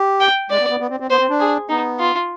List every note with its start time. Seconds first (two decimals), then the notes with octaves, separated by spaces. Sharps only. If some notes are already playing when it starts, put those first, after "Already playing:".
Already playing: G4
0.20 G5
0.50 G#3 D5
0.60 B3
0.70 B3
0.80 B3
0.90 C4
1.00 C4
1.10 B3 C5
1.20 C4
1.30 D4
1.40 G#4
1.69 B3 D#4
1.99 F4